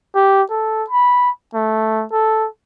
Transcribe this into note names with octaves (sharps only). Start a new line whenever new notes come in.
G4
A4
B5
A3
A4